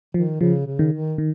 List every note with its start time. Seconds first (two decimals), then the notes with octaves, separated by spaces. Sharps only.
0.14 D#3 F3
0.41 C#3 F3
0.67 C#3
0.79 D#3
0.93 D#3
1.18 D#3